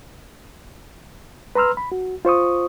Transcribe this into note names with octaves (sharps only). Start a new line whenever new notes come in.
B4 A#5 C6 E6 F6
B5
F#4
F4 C5 C#6 D#6